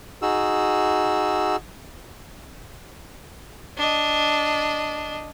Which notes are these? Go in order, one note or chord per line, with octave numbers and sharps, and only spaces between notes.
D#4 F#4 G#4 E6
D4 D#5